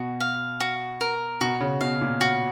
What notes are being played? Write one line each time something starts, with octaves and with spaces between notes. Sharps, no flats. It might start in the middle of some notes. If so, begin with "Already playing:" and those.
Already playing: B2 F#4
F5
F#4
A#4
B2 F#4
C#3
B2 F5
A#2
F#4